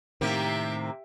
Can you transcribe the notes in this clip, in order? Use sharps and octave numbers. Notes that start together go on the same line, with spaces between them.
A2 C3 D#3 A#3 C4 G4 E5